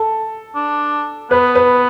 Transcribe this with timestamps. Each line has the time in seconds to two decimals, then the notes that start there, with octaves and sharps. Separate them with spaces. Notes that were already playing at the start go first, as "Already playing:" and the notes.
Already playing: A4
0.55 D4
1.31 B3 B4
1.55 B4